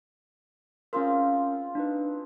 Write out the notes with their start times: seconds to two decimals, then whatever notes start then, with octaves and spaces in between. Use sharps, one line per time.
0.93 C4 C#4 F4 G#4 A#4
1.75 D4 D#4 B4